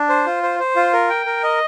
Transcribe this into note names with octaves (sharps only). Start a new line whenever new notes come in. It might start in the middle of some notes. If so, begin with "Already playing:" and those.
Already playing: D4
C5
F4
C5
C5
F4
A#4
G5
A#4
D#5